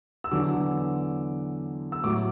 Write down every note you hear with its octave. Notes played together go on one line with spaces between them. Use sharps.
E6
E2 D3 F#3 D6
E6
A2 F#3 D6